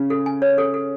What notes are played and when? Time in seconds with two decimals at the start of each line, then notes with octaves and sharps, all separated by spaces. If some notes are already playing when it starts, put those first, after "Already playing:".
Already playing: C#3 C#4
0.10 A4
0.26 G#5
0.42 C#5
0.58 A4
0.74 A4